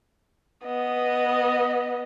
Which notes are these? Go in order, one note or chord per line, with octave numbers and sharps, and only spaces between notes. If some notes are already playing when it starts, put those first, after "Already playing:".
B3 D#5